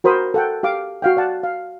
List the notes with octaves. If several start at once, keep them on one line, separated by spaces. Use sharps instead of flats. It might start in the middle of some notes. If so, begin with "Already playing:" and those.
F#4 A#4 C5 B5 D#6
A4 F#5 G5
G4 F5 D6
F#4 F5 G5
D5 F#5 A5
F5